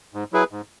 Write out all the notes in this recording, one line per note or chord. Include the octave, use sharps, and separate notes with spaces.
G#2
F#3 E4 G#4 B4
G#2